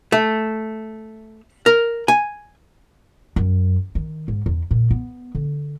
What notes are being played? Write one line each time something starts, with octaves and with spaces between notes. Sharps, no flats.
A3
A#4
G#5
F#2
D#3
G#2
E2
A#2
B3
D3